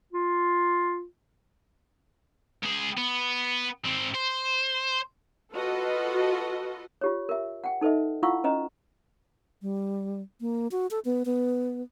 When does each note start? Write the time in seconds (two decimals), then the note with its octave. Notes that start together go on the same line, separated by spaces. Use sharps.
0.13 F4
2.63 C#2 G#4
2.97 B3
3.84 G#2 C4
4.14 C5
5.54 F4 F#4 A4 B4 D#5
7.01 F4 G4 C#5
7.29 A#4 E5
7.64 F#5 G5
7.81 D#4 A4 B4 D#5 E5
8.23 E4 F4 F5 F#5 C#6 E6
8.44 C#4 B4 D#5 A#5
9.62 G3
10.41 A#3
10.71 F#4
10.91 A4
11.05 B3
11.25 B3